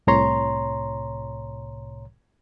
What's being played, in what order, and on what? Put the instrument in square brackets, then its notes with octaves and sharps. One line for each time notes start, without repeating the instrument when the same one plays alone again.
[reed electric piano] C2 A2 C3 C#5 A#5 C6